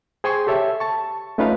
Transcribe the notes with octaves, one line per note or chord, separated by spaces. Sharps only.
G#4 C5 G5 G#5 C6 C#6
G4 A4 C#5 E5
A5 C#6
A3 C#4 D#4 F4 B4 F5